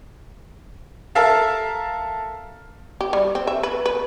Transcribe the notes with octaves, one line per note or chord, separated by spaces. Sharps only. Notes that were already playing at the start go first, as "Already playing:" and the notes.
A4 A#4 E5 F5 A5
G4
G3
C4
E5
B4
B4